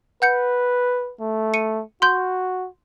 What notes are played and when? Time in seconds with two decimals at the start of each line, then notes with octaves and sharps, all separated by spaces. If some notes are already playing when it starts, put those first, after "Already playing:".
0.22 B4 F#5 G6 C#7
1.21 A3
1.54 C#7 D#7
2.02 F#4 C6 G6